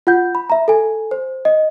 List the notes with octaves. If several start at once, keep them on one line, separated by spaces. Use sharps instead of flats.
F4 F#5 G6
B5
E5 A#5
A4 G#5
C5
D#5